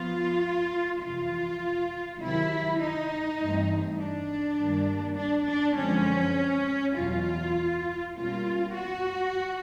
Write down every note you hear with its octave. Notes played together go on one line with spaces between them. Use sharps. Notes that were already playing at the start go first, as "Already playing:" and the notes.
Already playing: F3 B3 F4
F2 C3 E3 F4
C3 D#3 F#3 E4
D#4
G2 E3 A3 C4
D4
G2 D#3 G3 A#3
D4
D4
F#2 D3 F3 G#3 C4 C#4
E2 B2 F#3 F4
B2 G3 A#3 C#4 F4
F#4